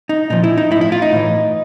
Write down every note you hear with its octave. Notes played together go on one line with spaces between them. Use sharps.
D#4
A#2 F3 D#4
E4
D#4
A2 E4
F3
E4
F4
D#4
A2 E3